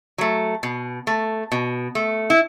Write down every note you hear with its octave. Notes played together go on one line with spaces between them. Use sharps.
F#3 A3
B2
A3
B2
A3
E4